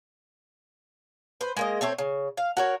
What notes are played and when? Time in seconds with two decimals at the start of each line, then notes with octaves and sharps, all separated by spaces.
1.41 B4 C5
1.57 G#3 A#3 D#5
1.81 A3 C4 C#5 E5
1.98 C#3
2.37 F5
2.57 F#4 A#4 C#5